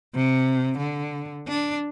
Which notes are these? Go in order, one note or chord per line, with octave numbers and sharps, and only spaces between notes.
C3
D3
D4